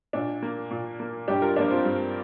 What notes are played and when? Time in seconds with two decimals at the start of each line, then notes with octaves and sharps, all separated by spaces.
0.13 A#2 D4
0.42 A#3
0.70 A#2
1.00 A#3
1.28 G2 D4 G4
1.42 F4 A#4
1.56 F3 A#3 D4
1.71 C4 F4
1.85 G2